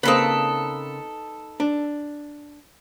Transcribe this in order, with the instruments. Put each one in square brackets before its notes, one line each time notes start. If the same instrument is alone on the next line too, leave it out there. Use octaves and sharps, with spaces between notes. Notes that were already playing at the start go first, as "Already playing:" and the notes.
[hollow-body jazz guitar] C#3 A#3 C4 [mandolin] D#4 A4 B4
[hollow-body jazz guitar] D4